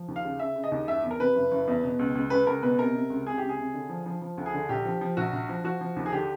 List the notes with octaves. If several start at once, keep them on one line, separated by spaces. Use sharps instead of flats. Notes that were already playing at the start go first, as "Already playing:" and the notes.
Already playing: F3
D#2
F5
C#3
C#3 E5
C#3
D#5
D#2
F#1 E5
E2
A#4
C3 B4
F#1
F#1
E2
B2
C#2
C#2
C#2 B4
C#2 A#4
B2 B4
C3 A#4
C3
C#2
C3 G#4
C#2 G4
G#4
C3
D3
F3
F3
F3
D2
G#4
D3
A#1 G4
F3
F3
A#1 F#4
A#1
F3
F3 F#4
F3
D#2
G#4
D3 G4